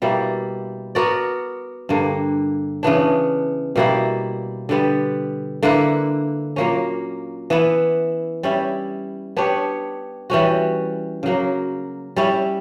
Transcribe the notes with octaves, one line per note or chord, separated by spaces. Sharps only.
B2 G3 A#3 E4
B3 F#4 A#4 D5
G2 D3 A#3
C#3 E3 B3 D4
B2 G3 A#3 E4
D3 G3 B3
D3 A#3 E4 B4
A#2 F#3 A#3 C#4
E3 B3 E4
G3 C#4 E4
B3 D4 G4 C#5
E3 G3 C#4 F#4
C#3 F#3 A#3
G3 C#4 E4